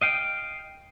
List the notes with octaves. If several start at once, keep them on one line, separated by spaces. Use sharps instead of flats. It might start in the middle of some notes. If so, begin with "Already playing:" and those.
D#5 F5 G5